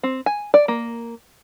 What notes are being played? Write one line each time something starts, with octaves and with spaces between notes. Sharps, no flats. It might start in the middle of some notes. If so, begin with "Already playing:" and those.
C4
G#5
D5
A#3